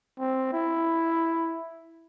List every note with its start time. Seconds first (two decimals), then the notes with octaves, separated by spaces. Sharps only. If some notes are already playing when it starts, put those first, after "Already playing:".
0.19 C4
0.53 E4